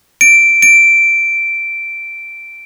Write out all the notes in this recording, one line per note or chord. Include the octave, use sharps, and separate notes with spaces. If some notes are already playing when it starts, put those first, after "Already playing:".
D7
D7